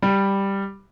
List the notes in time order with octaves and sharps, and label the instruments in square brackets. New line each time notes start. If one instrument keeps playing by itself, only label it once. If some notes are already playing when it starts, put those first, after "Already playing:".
[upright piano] G3